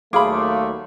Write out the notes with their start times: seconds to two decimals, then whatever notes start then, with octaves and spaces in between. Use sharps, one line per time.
0.13 D#2 F#3 A3 G#4 F5 B5 C6 D6